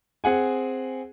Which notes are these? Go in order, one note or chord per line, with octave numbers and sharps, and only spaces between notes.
C4 G#4 F#5 G#5